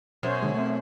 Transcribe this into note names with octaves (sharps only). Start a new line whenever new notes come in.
F#2 B2 C5 C#5
D3 G#3
A3 C4